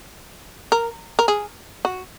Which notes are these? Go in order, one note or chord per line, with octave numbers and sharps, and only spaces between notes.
A#4
A#4
G#4
F#4